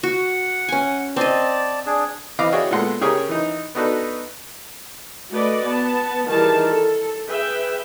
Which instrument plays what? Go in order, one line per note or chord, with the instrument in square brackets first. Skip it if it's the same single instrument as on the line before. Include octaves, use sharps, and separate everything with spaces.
[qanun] F#4 [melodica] F#5
[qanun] C#4 G#5
[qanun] C4 D#5 [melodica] D5 A5
[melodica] D4 G#4
[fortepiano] E3 C4 D#5 F5 B5 D6
E4 F#4 G#4 C#5 D5 G5
A#2 G#3 B3 A4 F#5 C6
C#3 G4 G#4 A#4 C#5 D#6
E3 D#4
B3 D4 D#4 F#4 A4 B4
[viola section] A3 F#4 B4 D5 D#5
B3 A5
D#3 E3 G3 G#4 A#4 A5
A4
G#4 B4 E5 G5